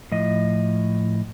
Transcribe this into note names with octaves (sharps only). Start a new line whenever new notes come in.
A2 F3 D#5